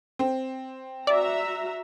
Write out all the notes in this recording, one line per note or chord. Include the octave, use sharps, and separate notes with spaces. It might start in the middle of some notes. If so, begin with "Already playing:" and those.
C4
F#4 D5 E5 A#5